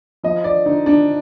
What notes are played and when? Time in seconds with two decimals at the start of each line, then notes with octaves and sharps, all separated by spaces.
0.23 F3 D#5
0.44 D5
0.66 D3 D#4
0.86 D4